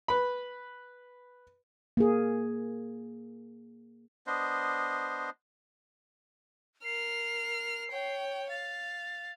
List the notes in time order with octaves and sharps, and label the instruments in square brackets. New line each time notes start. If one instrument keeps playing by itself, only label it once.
[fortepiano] B4 B5
[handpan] A#3 G#4
[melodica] B3 D4 C5 D#5
[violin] A#4 F6 [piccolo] C7
[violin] C#5 G5
[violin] F5 [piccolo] A6